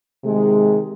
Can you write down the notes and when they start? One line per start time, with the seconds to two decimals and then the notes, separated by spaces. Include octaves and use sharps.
0.23 C3 D#3 G#3